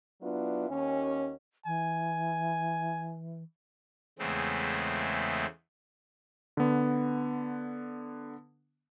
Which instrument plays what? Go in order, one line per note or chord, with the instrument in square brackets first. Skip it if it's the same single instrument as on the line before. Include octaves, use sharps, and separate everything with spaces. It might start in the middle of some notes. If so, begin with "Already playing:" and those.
[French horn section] F#3 B3 D4 E4 F4
D#2 C#4
[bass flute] E3 [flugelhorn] G#5
[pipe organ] E2 C#3 G#3 A3 C4
[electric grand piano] D3 B3